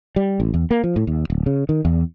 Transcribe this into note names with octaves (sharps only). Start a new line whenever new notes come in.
G3
A1
E2
A#3
F3
A2
D#2
D1
C#3
D#3
E2